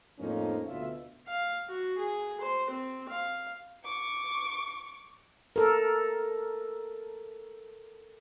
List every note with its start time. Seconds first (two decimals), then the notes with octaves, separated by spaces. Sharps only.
0.19 F2 A2 F3 A#3 C#4 D#4
0.67 D2 B2 F4 E5
1.28 F5
1.68 F#4
1.98 G#4
2.41 C5
2.71 C4
3.09 F5
3.84 C#6 D6
5.56 A4 A#4